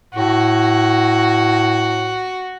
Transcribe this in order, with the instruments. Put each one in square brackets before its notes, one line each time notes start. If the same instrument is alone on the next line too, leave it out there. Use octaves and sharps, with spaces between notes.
[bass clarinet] A2 [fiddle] F#4